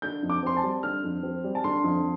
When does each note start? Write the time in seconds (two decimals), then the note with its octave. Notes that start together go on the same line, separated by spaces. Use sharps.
0.02 D3 G6
0.23 F2
0.30 D6
0.43 C4 C6
0.57 A5
0.63 G3
0.83 D3 F6
1.04 F2
1.23 C4
1.44 G3
1.55 A5
1.64 D3 C6
1.84 F2